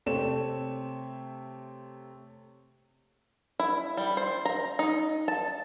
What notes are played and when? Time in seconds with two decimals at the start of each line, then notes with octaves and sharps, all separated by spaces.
0.06 C3 A3 C4 C#5 E7
3.59 E4
3.97 G3
4.17 C5
4.45 A#5
4.79 D#4
5.28 A5